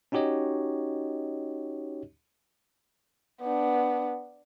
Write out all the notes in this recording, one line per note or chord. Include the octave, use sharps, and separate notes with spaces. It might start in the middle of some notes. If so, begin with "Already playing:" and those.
C#4 D#4 F#4 G4 C#5 D#5
B3 D4